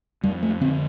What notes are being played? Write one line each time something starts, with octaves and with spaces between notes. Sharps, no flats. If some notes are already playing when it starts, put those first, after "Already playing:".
F2 G3
A3
D3 C4